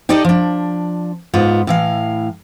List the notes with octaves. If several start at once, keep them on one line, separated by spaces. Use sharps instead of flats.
D#4 G4 A4 D5 D#5
F3 D4
G#2 B3 F4
A2 E3 F5